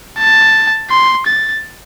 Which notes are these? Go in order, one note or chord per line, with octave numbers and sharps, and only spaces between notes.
A5
C6
A6